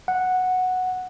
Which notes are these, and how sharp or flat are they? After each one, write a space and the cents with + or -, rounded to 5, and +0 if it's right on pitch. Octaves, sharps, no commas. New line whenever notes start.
F#5 -5